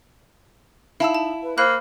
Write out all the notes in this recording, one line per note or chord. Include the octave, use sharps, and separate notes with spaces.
D#4 E4 F5 A5 E6
A5
B4
A#3 C5 F5 B5 F#6